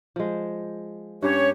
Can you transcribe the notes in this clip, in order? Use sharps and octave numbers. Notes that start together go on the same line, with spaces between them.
F3 G#3
G2 A#3 C#4 G4 C#5